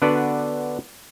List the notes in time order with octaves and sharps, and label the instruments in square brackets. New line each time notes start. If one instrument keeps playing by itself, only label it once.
[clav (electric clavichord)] D3 B3 D4 F#4 B4 D5